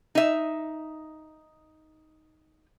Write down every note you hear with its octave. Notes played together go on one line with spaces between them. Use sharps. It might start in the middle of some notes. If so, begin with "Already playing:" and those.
D#4 E5